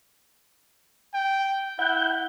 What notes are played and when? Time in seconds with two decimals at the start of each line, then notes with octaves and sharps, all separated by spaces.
1.14 G5
1.79 E4 F#5 G6